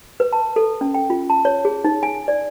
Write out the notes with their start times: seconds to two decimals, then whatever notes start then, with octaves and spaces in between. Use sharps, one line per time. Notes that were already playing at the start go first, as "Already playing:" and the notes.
0.20 B4
0.33 A5
0.56 A4
0.81 C#4
0.94 G5
1.10 F4
1.30 A5
1.45 C#5
1.65 G#4
1.84 D#4
2.03 G#5
2.28 D5